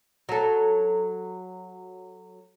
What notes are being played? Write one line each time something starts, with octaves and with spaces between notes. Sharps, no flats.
F#3 A4